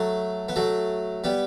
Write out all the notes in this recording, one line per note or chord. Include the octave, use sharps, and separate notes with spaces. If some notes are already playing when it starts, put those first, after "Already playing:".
Already playing: F#3 A3
B3
F#3 A3
G3 B3